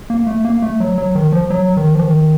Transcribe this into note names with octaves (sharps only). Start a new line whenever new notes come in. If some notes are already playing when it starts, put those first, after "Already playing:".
A#3
A3
A#3
A3
F#3
F#3
D#3
F3
F#3
D#3
F3
D#3